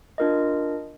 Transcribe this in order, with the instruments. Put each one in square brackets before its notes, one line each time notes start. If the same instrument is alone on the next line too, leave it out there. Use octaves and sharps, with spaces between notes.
[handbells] D4 F4 A#4 D#5